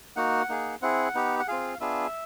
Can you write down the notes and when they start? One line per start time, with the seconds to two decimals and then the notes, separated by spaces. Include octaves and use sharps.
0.16 A#3 D#4 F#4 F#5
0.49 A#3 D#4 G#4
0.82 C4 E4 G#4 F#5
1.15 B3 D#4 G4
1.39 F#5
1.48 C4 F4 G#4 F5
1.80 B3 D4 F4 G#4 E5